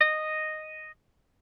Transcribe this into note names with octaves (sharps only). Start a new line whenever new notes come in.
D#5